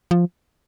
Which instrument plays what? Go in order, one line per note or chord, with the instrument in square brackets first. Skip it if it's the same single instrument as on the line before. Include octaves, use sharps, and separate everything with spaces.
[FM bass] F3